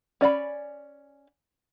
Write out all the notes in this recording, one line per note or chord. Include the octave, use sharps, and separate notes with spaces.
C#4 D5 F5 B5